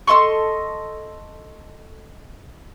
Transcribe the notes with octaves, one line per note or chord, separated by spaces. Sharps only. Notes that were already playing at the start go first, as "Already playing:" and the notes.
A4 D#5 C6 C#6